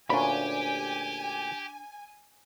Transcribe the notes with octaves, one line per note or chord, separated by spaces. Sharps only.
D2 A#2 C#4 D4 G4 G#5 B5